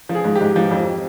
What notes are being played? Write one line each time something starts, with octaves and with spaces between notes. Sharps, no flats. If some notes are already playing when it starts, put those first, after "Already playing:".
F3
G#4
G#2
G4
G#2
F3
F2